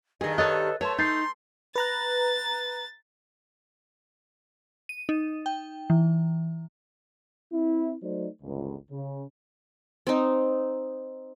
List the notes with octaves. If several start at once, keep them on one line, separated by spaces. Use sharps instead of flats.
G2 D#3 G#4 D#5
A4 B4 C#5 D#5 F#6 A6
A3 B4 C#5 A5 C6
D#4 C6 G6 A6 C7
B4 A#5 F#6 A6
D#7
D#4
G5
E3
C4 E4
F#3 A3 D#4 C5 D5
G1 C#2
C#3
C4 D#4